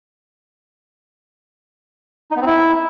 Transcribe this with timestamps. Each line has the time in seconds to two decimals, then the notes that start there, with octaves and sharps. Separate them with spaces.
2.31 D#4
2.36 B3
2.41 C4
2.46 E4